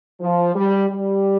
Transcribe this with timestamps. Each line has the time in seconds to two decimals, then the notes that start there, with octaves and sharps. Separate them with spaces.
0.20 F3
0.55 G3
0.90 G3